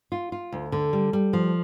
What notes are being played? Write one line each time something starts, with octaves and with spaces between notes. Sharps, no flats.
F4
F4
D2
D3
G3
G3
F3